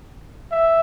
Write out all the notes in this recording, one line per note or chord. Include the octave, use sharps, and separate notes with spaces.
E5